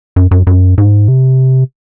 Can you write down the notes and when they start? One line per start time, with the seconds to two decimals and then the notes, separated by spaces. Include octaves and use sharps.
0.16 F#2
0.31 F#2
0.47 F#2
0.78 G#2
1.08 C3